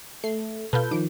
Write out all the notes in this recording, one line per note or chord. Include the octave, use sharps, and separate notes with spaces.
A3 C7
B2 F4 A4 B4 G6
D#3 F3 D6